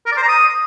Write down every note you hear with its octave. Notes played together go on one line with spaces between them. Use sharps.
A#4
D5
C5
A#5
D#6